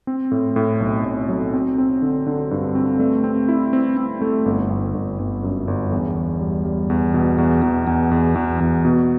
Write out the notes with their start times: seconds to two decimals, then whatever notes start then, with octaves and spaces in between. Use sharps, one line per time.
0.07 C4
0.31 A2
0.56 A2
0.80 B1
1.05 A2
1.29 F#3
1.53 C4
1.78 C4
2.02 D3
2.26 D3
2.51 G2
2.75 C4
3.00 A3
3.24 C4
3.49 E4
3.73 C4
3.97 C4
4.22 A3
4.46 G1
4.70 G1
4.94 G1
5.19 G1
5.43 F#2
5.68 G1
5.92 E2
6.16 E2
6.41 G3
6.65 G3
6.90 E2
7.14 B2
7.38 E2
7.62 E2
7.87 E2
8.11 E2
8.35 E2
8.60 E2
8.85 B2